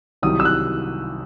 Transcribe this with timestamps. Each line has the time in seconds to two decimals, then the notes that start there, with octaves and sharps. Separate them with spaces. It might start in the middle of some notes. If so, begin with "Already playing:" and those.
0.22 C2 C3 D#3 F#3 D#6
0.40 E6
0.45 F#6